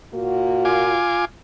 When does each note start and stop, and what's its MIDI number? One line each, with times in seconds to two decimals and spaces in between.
0.14 0.99 46
0.14 0.99 58
0.14 0.99 66
0.65 1.25 65
0.65 1.25 80
0.65 1.25 86